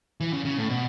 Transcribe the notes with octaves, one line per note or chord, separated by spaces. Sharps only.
E3
C#3
C#3
A2
B2